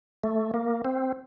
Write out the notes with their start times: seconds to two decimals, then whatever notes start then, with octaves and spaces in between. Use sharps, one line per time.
0.24 A3
0.54 A#3
0.85 C4